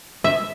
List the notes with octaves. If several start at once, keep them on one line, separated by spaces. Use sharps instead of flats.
E5